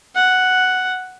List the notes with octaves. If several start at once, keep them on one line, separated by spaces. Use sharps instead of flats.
F#5